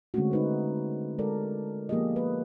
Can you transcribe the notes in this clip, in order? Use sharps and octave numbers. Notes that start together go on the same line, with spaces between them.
D3 G#3 A3 C4 C#4 F#4
D#4 B4 C5
G#3 A4 A#4 D5
F3 A#3 B3 G4 G#4 D#5
B4